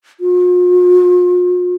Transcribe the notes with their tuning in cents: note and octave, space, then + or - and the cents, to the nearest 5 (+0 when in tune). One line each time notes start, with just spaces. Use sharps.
F4 +45